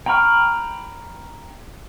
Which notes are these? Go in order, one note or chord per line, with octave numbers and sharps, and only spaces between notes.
G5 A#5 B5 C#6 F6